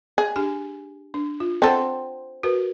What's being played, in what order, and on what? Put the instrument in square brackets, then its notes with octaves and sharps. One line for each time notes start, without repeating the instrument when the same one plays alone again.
[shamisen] G#4
[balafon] D4 G4 G#5
D4
F4
[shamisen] C4 A4 [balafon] D5 F#5 G5
[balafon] F#4 A#4 B4